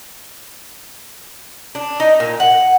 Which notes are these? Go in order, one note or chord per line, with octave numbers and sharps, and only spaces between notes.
D4
D#4
A#2
F#5